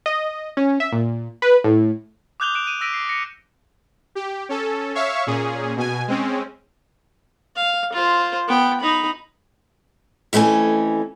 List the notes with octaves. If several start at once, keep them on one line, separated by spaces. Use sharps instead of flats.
D#5
C#4
E5
A#2
B4
A2
D6 D#6 F#6 G6 F7 G7
F#6 G6 D7 E7 F7
D#7 E7
E6 A#6 B6 D7 D#7
C7
A#6 C#7
G4
C#4 A4
C#5 E5 F5 C#6
A#2 C#4 G#4
B2 G#5
G#3 C4 C#4
F5
F4 C5
B3 G5
D#4 B5
F2 E3 A3 C#4 G#5